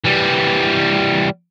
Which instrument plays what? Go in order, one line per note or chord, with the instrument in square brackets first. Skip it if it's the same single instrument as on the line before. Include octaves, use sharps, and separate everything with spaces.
[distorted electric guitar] E3 G3